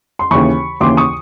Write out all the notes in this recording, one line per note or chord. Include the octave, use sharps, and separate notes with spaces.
C6
D#2 C#3 E3 B5 C#6
D#2 C#3 E3 C6 D6
C#6 D#6